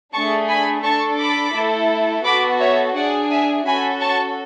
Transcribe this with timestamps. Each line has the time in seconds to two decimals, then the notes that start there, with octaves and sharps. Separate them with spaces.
0.13 A3 D4 G#4 A5 C#6
0.48 G#5 B5
0.83 D4 A4 A5 C#6
1.18 B5 D6
1.55 A3 E4 A4
2.25 B3 F#4 A4 B5 D6
2.60 C#5 E5
2.95 D4 G#4 D5 F#5
3.31 E5 G#5
3.65 C#4 F#4 A4 G#5 B5
4.01 A5 C#6